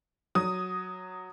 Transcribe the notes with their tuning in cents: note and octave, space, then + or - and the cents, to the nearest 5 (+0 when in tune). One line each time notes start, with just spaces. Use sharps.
F#3 +0 D#6 +0